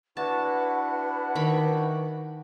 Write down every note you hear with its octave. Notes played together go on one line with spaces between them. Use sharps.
D4 E4 F#4 B4 F#5 A5
D#3 B5